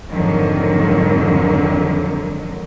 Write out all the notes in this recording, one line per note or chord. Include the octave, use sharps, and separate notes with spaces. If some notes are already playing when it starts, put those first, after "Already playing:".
F2 G#2 D3 D#3 F3 F#3